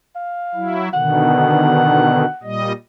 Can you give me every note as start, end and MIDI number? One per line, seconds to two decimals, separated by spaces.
0.15 0.80 77
0.55 0.89 54
0.55 0.89 64
0.93 2.25 47
0.93 2.25 50
0.93 2.25 51
0.93 2.43 78
2.43 2.72 46
2.43 2.72 55
2.43 2.72 75